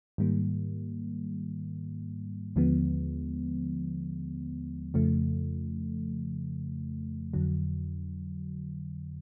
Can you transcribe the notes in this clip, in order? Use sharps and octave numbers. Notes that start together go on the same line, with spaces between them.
G#2 D#3 G3 A#3
D#2 D3 F3 G#3 B3
F2 C#3 F3 A3
F2 D3 F#3